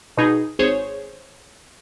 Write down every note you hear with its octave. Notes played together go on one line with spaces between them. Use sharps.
B2 D#4 G#4
G#1 G#4 C5 C#5